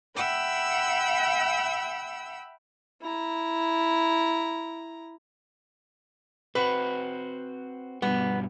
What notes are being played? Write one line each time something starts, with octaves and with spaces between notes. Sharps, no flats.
E5 F#5 G5 B5 E6
E4 A#5
C4 F#4 B4
G2 B2 G3 B3